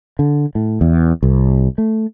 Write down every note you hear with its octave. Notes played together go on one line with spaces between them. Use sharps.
D3
A2
E2
C2
A3